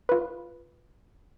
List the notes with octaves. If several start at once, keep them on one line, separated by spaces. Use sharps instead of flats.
F4 B4